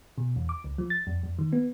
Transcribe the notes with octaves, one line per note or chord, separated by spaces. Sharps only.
B2
E2
D6
C#2
F3
A6
F2
F2
D#3
B3